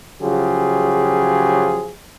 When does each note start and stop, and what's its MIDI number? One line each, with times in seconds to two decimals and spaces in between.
0.22 1.93 49
0.22 1.93 53
0.22 1.93 54
0.22 1.93 65
0.22 1.93 67
0.22 1.93 68